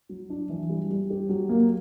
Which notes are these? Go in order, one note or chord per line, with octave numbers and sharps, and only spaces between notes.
F#3
D4
E3
G3
G3
G4
F#3
A#3